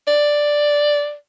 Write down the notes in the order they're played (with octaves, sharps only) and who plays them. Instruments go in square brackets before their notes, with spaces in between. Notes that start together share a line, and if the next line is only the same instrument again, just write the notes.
[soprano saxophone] D5